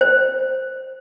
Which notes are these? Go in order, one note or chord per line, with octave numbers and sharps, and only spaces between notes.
C5